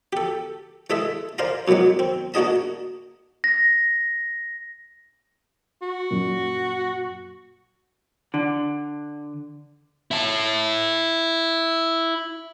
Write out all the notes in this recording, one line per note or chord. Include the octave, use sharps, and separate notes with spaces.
G4 A4
E3 G#3 G#4 A4 E5
A#4 C5 D5 F5 G#5 A#5
F#2 B2 E3 F#3 G#3
C4
A#3 D4 F#4 G#4 D#5 A5
A#6
F#4
F#2 A#2
D3
E4 A5